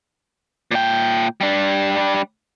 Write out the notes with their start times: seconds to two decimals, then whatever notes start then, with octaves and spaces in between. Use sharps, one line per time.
0.71 A#2 G5
1.41 G3 D4